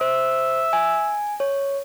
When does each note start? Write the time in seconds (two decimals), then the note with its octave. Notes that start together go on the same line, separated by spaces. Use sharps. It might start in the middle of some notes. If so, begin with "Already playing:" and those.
0.01 C5 E5
0.73 G#5
1.40 C#5